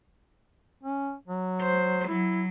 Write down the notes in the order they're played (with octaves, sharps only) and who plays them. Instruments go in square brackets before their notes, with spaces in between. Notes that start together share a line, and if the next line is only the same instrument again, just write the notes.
[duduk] C#4
F#3
[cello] C5
[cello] F#3 [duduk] E4